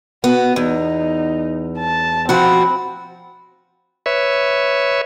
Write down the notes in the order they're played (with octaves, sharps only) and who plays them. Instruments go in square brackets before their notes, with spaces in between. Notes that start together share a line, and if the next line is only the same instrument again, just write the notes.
[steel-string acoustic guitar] B3 [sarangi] F#4
[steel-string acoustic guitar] E2 [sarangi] D#4
[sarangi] A5
[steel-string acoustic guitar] F3 F#4 [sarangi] C4 [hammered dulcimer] F#5 B5
[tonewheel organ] B4 C#5 E5